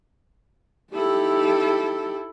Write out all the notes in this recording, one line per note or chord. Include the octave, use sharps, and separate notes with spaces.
D#4 E4 G4 A4